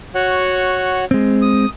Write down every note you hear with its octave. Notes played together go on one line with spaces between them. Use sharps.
F#4 C#5 F#5
G#3 C4
D#6